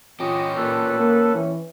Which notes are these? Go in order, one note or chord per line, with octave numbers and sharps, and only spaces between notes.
C#4 F4 G4 D#5
A#2 A4 B4
A#3
E3